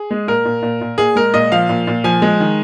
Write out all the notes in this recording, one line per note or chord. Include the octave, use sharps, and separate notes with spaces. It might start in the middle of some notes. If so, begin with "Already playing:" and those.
Already playing: G#4
G#3
A#2 A#4
A#2
A#2
A#2
A#2 G#4
G#3 A#4
A#2 D#5
F3 F5
A#2
A#2
F3 G#5
G#3
D#3